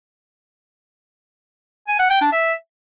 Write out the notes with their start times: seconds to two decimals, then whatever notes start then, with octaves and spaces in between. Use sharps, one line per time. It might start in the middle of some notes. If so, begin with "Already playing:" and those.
1.88 G#5
1.99 F#5
2.10 G5
2.21 D4
2.32 E5